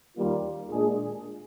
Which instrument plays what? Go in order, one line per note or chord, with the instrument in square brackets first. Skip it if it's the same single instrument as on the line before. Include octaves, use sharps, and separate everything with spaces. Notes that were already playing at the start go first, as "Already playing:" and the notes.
[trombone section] D#2 D#3 G3 A#3 F4
A#2 G#3 D4 G#4